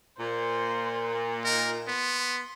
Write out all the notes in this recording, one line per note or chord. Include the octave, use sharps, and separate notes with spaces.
A#2 C5
D#4 A#4
B3 C6